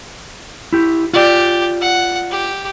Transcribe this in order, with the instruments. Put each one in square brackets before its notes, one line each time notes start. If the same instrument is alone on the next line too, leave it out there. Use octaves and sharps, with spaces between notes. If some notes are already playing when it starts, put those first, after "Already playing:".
[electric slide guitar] E4 G4
[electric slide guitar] F4 D5 [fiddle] G4
[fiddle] F#5
G4